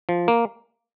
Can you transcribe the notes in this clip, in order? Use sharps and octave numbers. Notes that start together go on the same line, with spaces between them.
F3
A#3